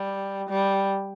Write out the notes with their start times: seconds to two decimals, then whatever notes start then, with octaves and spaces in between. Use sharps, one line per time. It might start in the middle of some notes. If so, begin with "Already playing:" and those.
Already playing: G3
0.50 G3